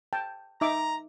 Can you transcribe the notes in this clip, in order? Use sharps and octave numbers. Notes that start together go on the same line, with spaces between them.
G5 A5
D#4 E5 A#5 D6